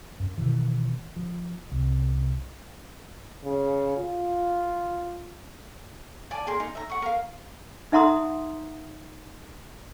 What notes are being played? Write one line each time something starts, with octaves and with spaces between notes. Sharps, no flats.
F#2
B2 D#3 E3
F3
C2
C#3
F4
D5 G#5 A5 D6
G#4 A#4 G#5 C6
D#4
E5 A#5
F#5 C#6
A#4 F5
D#4 E5 F#5 A#5 C6 D#6